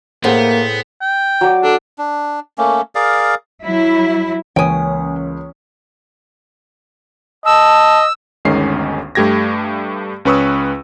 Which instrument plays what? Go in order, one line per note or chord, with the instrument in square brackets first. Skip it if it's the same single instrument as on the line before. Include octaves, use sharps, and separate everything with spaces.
[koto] A2 [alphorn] A#3 [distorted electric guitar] B3 [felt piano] G#4 C5 F#5
[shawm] G5
[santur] F#3 D5
[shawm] D4 [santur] A4
[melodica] D4
A3 A#3 C#4
G#4 A#4 D5 F5
[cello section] F#3 E4
[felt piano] C#2 A#3 [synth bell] E3 D#6 [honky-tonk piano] C#4 [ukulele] G5 G#5
[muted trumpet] D#5 [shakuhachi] A5 [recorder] E6
[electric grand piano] G1 D2 D#3 G#3 C#4 C7
G2 A3 G4 G#6 A#6
C#2 C#4 B4 C#6 D#6 E6